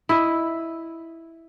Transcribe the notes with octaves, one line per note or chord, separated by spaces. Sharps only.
E4 D#5